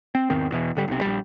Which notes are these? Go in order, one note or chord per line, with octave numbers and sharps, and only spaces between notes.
C4
E2 G#2 D#3 C4
E2 B2 E3
G#1 D3 G3
B1 C3
A#1 G3